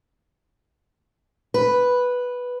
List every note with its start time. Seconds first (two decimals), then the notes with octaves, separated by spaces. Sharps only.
1.54 B4